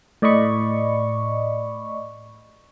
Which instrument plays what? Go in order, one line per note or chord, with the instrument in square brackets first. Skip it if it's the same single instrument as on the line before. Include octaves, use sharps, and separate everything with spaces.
[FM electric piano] A2 D5 D#5 B5 C#6